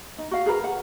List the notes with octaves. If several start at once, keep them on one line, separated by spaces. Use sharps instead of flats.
D#4
F#4 F5
G#4 A#4 B4 A#5
F#5